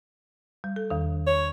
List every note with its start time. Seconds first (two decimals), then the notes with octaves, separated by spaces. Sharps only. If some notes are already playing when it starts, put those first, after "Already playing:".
0.64 G3
0.76 A4
0.90 E2 D#3
1.27 C#5